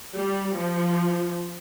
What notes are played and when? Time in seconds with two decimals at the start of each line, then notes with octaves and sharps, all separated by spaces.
0.15 G3
0.55 F3